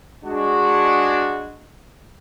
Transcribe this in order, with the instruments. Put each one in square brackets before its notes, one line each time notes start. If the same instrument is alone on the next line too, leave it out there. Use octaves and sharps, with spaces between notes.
[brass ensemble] G#3 D4 F#4